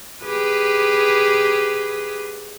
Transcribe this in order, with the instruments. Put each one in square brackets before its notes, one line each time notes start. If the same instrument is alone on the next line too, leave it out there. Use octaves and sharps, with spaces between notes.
[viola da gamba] G4 G#4 B4